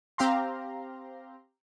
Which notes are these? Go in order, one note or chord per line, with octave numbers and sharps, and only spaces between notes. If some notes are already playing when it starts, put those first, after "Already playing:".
C4 G4 F5 A#5 C6